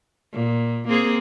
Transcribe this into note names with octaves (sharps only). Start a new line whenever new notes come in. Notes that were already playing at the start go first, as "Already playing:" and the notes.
A#2
A#3 C4 G#4